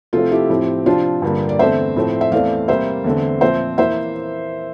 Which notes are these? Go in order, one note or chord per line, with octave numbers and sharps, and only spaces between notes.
C3 F3 A3 C4 F4 A4
E4 G4
A2 F3 C4
C3 F3 C4 D4 F4
G2 D3 G3 A#3
D5
E2 D3 A3 C4 C5 E5
A2 F3 A3 C4
E5
E2 E3 A3 C4 D5 F5
C3 G3 A#3 C5 E5
E2 D3 A3 C4
A#2 F3 C4 C5 E5
E3 A#3 C5 E5